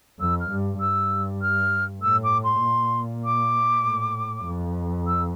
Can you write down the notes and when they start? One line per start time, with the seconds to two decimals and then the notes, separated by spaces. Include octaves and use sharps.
0.20 F2 E6
0.40 F6
0.50 G2
0.80 G2 E6
1.41 F6
2.02 A2 E6
2.23 D6
2.43 C6
2.63 A#2
3.24 D6
3.85 A2
4.46 F2
5.07 E6